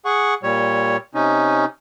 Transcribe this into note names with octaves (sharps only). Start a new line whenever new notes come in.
G#4 F#5 C#6
A#2 G3 C#5
C3 C#4 D#4